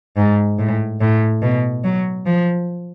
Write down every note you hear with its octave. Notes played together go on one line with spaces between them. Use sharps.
G#2
A2
A2
B2
F#3
F3